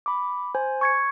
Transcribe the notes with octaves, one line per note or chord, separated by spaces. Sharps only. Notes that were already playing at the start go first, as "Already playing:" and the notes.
B5 D6
C5 G#5
C#6 G#6 C#7